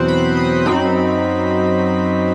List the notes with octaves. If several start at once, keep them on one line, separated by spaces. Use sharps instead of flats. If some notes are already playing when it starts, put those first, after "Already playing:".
Already playing: E2 B2 F#3 C4 C5 F#5
B5
D#6
F#2 F#3 C4 D#4 B5